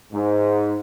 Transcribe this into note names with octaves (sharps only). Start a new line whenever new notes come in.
G#2